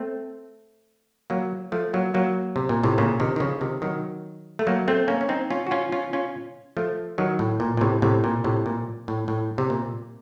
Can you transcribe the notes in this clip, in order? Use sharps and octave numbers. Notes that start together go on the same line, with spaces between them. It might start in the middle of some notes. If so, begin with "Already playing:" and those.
Already playing: A3 C4
F#3 A#3
F3 A3
F#3 A#3
F#3 A#3
C3
A#2
A2 C3
A#2 C#3
C3 D#3
D#3
C#3 F3
C3 D#3
D#3 F#3
A3
F#3 A#3
A3 C4
A#3 C#4
C#4
C4 D#4
C#4 F4
F#4
C#4 F4
C#4 F4
C#4 F4
F3 A3
D#3 F#3
A2
A#2
A#2
A2 C3
A2 C3
A#2
A2 C3
A#2
A2
A2
C3
A#2